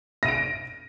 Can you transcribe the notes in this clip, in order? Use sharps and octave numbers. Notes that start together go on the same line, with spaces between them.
A#6 D7 D#7